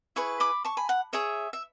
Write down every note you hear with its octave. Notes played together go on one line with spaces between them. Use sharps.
E4 G#4 B4 C#6
B5 D6
A5 C#6
G#5 B5
F#5
G#4 C#5 E5
E5